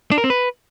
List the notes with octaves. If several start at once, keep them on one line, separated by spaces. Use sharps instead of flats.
D4
A#4
C4
B4